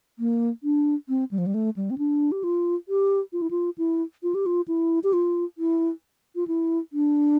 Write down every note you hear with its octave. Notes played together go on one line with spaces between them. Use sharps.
A#3
D4
C4
G3
F3
G3
A3
G3
C4
D4
G4
F4
G4
F4
E4
F4
E4
F4
G4
F4
E4
G4
F4
E4
F4
E4
D4